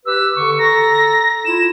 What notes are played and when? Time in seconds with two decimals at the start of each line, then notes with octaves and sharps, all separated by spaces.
0.06 G4 B4 E6
0.36 D3 C#6
0.59 A4 A#5 A#6
1.45 E4 F4 E7